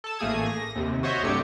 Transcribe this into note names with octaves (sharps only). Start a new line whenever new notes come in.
A4 A5
A1 A3 A#3 G#4 D#6 G#6
A#6
D#2 C3
F#4 C5 C#5 D#5 E5
C2 G2 C3 A3 G4 C#7